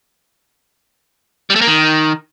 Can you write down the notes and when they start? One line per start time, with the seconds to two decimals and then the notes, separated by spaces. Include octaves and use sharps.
1.50 G3
1.56 A3
1.61 A#3
1.67 D#3